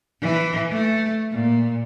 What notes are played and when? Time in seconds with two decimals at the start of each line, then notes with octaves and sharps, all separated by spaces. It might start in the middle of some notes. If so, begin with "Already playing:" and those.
0.21 E3
0.71 A3
1.31 A#2